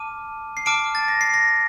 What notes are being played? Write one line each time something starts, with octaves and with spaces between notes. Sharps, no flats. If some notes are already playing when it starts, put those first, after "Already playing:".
Already playing: A5 D6 F6 D#7
C7
A5 D6 F6 D7
A6
A#6
C7
A#6